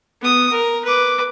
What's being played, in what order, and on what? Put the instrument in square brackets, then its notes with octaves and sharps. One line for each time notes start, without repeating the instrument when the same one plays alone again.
[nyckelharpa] B3 D#6
A#4
B4 D6